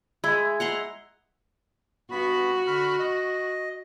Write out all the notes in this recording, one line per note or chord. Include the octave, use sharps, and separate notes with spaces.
G#3 E4
F#5 A#5 C6
G2 B3 F#4 B5
D3 B5 F6
D#5